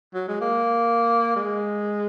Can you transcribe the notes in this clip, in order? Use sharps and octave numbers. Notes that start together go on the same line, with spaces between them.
F#3
G#3
A#3
G#3